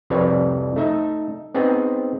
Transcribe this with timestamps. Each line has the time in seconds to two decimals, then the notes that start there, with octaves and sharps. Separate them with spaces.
0.10 C2 F2 G3 B4 C#5
0.76 A3 D#4 E5
1.54 B3 C4 D#4 G#4